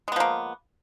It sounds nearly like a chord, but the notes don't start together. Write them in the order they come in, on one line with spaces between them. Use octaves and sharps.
G#3 B3 F3 A#3